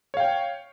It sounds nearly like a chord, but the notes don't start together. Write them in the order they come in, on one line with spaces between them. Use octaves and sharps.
C#5 F5 G5